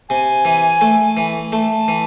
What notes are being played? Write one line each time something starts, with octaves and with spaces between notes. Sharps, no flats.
C3 G#5
E3
A3
E3
A3 A5
E3